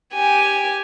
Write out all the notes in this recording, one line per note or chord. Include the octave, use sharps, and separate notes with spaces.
G4 G#5